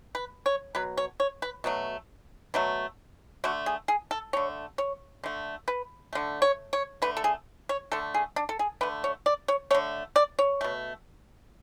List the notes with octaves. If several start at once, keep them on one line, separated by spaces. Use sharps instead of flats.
B4
C#5
B2 F#3 B4
C#5
C#5
B4
B2 F#3 A3
B2 F#3 A3
D3 A3 F#4
G#4
G#4
A4
D3 A3 C#5
C#5
D3 A3
B4
D3 A3
C#5
C#5
D3 A3 B4
A4
G#4
C#5
D3 A3 A4
G#4
D4
A4
G#4
D3 A3 B4
C#5
D5
C#5
D3 A3 C#5
D5
C#5
B2 A3